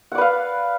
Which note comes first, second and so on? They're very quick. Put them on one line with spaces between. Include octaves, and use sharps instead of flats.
F#5 D5 B4 F5